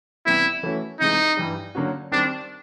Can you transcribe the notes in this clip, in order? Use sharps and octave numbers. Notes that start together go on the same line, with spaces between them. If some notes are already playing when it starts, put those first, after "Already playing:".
C3 E3 G3 B3 E4
E3 A3 C#4 F#4
C3 E3 G#3 D#4
G2 E3 G3
D3 F#3 A#3 C#4 F#4
D#3 G3 C4 D4